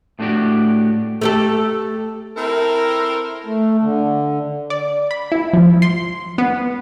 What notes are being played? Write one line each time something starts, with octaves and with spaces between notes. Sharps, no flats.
A2 A3 B3 D4 F#4 G4
A3 G4 A4
C4 E4 A4 A#4
A3
D3
D5
B5
E4
F3
C6
B3